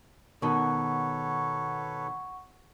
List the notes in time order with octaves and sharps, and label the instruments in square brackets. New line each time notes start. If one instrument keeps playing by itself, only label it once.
[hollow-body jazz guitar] B2 D#3 [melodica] A4 B4 C#5 [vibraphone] F#5 C#6